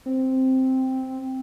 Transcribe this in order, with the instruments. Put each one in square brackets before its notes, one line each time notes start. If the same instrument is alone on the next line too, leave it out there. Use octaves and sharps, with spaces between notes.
[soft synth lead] C4